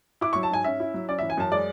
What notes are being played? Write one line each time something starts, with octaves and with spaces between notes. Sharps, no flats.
E4 D6
F#3 C#6
A5
G#2 G#5
C#4 E5
E4
F#3
C#4 D5
E3 E5
G#5
F#2 A5
G#3 D5